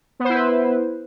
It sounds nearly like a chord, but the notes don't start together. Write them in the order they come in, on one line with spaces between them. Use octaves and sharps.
B3 C5 E4 B4